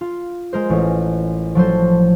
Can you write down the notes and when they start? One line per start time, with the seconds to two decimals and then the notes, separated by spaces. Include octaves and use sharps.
0.01 F4
0.53 G#3 A#4 C5
0.70 A1
1.55 F3 F#3 A4 C5